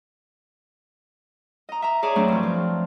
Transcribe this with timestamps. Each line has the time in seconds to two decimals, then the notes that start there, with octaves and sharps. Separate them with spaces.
1.69 D#5 A#5
1.82 E5 A#5
2.03 G#4 C#5 D5 A5 A#5
2.16 F#3 A3 C4 D4
2.28 G2 F3
2.43 F3